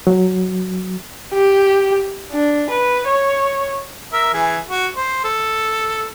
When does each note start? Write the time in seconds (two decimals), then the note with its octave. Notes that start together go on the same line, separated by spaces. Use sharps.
0.07 F#3
1.33 G4
2.32 D4
2.70 B4
3.07 C#5
4.13 A#4 E5
4.34 E3 G#4
4.70 F#4
4.96 C5
5.25 A4